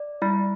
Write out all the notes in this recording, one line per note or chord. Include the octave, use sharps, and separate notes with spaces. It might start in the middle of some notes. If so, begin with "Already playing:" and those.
Already playing: D5
G3 E4